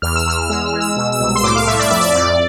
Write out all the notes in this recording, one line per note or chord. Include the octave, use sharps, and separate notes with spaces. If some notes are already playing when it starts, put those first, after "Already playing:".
E2 F6
E6
E2 F6
F6
G#3 E6
F6
G#3
E6
B2 E6
E6
C2
E6
C6
A2 D6
F5
A2 E5
D5
F2 E5
D5
F2